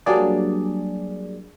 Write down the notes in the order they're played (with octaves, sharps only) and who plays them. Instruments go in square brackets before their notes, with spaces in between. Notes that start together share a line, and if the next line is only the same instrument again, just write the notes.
[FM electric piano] F#3 G3 A#3 D4 G#4 D5